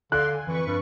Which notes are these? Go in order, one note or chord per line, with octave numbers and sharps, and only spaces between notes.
D3 D5 F5 C6 F#6
G#5
F2 E3 B4 C#6
G2